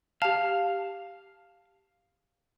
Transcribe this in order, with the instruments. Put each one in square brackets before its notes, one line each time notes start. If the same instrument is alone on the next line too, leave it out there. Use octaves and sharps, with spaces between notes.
[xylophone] G4 A5 [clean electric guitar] F5